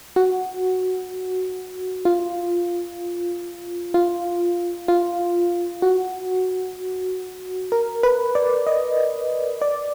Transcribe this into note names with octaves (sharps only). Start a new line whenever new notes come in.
F#4
F4
F4
F4
F#4
A#4
B4
D5
D#5
D5